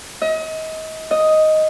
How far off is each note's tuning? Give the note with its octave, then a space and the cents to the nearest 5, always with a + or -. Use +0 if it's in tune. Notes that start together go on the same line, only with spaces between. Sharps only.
D#5 +35
D#5 +5